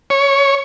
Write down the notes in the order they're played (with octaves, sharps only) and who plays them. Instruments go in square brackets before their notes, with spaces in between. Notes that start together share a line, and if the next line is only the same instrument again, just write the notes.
[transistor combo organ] C#5